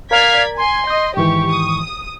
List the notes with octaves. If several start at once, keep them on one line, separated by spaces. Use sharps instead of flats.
A#4 D5 F5 A#5 G#6 B6
G#5 C6
D#5 D#6 G6
G#2 D#3 E3 G4 C#6
D#6